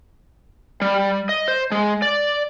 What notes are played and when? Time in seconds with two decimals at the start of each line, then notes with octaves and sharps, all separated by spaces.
0.82 G3
1.29 D#5
1.48 C5
1.72 G#3
2.02 D5